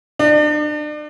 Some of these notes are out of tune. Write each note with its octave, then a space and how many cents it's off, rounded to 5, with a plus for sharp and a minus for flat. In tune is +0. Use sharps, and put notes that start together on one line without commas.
D4 +35